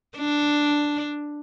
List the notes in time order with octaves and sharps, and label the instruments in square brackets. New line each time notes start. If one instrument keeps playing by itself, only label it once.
[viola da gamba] D4